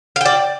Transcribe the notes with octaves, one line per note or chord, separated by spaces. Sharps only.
D5 F5 G5